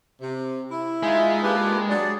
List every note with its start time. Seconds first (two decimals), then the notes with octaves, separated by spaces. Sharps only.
0.20 C3
0.71 E4
1.03 G#3 D#4 F4 E5
1.43 A#3 D4 F4 G4 B4
1.89 F#3 D4 G#4 D5